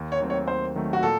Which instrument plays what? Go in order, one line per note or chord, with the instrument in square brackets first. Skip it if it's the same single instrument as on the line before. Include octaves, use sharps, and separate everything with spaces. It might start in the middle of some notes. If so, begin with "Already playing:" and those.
Already playing: [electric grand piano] D#2
[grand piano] C#5
[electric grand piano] D#3 F#3 A3 C4
[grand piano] C#5
[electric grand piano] D#2 [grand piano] C5
[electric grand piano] D#3 F#3 A3 C4
[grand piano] F#4
[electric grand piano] A#2 [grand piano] A4